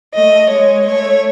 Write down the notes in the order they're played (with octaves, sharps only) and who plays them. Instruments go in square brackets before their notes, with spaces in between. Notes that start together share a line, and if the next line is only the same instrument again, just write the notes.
[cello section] A3 [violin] D#5
[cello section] G#3 [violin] C#5
[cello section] A3 [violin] C#5